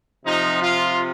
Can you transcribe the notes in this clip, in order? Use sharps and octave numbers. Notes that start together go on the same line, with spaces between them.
C3 F3 D#4
F4